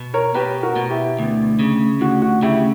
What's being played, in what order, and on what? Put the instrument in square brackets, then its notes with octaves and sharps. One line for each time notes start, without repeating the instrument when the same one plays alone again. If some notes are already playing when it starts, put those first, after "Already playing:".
Already playing: [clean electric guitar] B2
[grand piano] A#4 C#5
[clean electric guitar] B2 [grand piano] G4 B4
[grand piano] F#4 A#4
[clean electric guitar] B2
[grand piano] E4 G4
[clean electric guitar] D2
C#3
[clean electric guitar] D2 [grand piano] F#4
[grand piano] F#4
[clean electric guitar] C#3 [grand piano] E4 G4